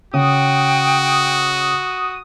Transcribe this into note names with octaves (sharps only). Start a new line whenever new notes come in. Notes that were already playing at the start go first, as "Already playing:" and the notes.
C#3 F#4 G5 D#6